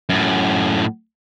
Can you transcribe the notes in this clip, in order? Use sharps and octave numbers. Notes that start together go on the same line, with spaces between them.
F#2 A2